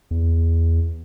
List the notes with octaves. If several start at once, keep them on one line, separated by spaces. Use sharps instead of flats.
E2